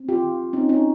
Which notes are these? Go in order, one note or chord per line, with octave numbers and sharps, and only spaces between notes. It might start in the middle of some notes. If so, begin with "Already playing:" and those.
Already playing: C4
F4 G4
D#3
C4 C#4 D#4
C#4 D#4